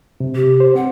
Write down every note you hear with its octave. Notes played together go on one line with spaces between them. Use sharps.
C3
G4
C5
C4 F#5